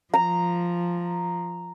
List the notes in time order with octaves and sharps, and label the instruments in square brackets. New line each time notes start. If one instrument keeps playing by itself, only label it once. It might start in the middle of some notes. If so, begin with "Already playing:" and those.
[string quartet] F3 [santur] A#5